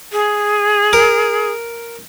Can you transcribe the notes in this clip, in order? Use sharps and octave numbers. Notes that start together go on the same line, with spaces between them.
G#4
A#4